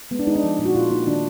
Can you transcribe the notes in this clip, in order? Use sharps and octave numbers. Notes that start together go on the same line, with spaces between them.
G#3 B3
D4
G#3 D#4
D4
F3
A#2
F#4
A#2 F4
A#3 D#4
D#3 D4